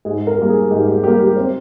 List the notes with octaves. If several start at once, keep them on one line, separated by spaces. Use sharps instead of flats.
G#2 G#4
A#4
G3 A#3
G#4
G#2 G4
G4
G3 A#3 G4
G4
C4